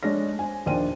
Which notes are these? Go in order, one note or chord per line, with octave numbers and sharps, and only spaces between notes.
G#3 D4 G#4 C#5 A#6
C5 G#5
A#1 D#2 D4 C5 G5 D#7